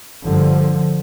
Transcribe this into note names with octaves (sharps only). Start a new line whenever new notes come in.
G1 G2 D3 F3